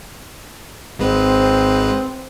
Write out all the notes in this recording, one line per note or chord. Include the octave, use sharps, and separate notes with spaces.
G#1 G#3 C4 B4